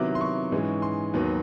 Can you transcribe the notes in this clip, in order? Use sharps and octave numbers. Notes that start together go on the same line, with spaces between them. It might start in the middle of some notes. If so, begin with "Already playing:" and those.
Already playing: C3 D#3 F#3 B3 E4 D6
C6
C#6
G#2 E3 G#3 C#4
C6
D#2 D#3 F#3 B3